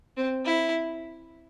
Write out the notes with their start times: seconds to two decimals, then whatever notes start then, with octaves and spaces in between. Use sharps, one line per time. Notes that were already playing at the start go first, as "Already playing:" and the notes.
0.17 C4
0.45 E4